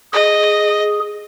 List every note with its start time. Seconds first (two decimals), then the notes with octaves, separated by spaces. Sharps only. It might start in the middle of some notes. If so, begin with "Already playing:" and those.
0.13 G#4 D#5